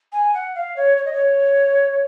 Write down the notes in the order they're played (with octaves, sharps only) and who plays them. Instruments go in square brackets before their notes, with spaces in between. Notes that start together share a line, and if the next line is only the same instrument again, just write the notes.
[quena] G#5
F#5
F5
C#5
C#5
D#5
C#5